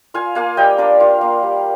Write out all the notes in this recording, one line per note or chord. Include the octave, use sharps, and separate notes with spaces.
F4 F5 G#5
A#3 F5 G#5
G3 D#5 G5
D4 A#4 D5
F4
A#3
G3